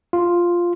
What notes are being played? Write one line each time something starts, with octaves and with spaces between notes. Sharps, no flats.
F4